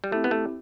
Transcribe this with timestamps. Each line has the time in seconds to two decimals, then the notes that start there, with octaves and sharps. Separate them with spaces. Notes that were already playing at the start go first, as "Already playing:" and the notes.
0.04 G3
0.11 A3 C4 E4 G4
0.24 B3
0.31 A3